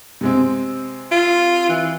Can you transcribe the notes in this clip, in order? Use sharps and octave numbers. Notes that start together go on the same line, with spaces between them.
C3 G#3 C4
F4
E3